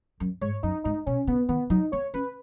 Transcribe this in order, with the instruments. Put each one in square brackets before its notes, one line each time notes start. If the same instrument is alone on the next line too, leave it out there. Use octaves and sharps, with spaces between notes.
[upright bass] F#2
[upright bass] G#2 [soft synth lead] C#5
[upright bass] F#2 [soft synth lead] D#4
[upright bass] G#2 [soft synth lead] D#4
[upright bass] B2 [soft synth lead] C#4
[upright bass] C#3 [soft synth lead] B3
[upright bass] D#3 [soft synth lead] B3
[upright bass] F#3 [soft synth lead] D#4
[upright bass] B3 [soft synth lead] C#5
[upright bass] C#4 [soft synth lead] B4